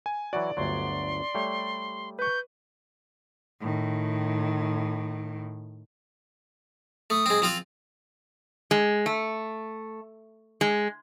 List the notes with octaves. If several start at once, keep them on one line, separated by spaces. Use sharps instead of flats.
G#5
E3 F#3 F#4 D5
G1 D2 F#3 C6
G3 A3 C#5
B4 C#6 G6
A2 D#3
A3 D#6
G#3 C4
F3 C4 F4
G#3
A3
G#3